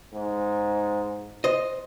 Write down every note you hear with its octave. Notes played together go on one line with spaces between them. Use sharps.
G#2
C5 D#5